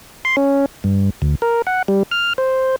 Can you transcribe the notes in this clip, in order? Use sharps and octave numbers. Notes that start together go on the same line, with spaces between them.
C6
C#4
G2
D2
A#4
F#5
G3
F6
C5